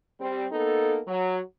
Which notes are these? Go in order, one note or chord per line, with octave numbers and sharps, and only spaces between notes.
G3 C4
A#3 B3 D#4 A4
F#3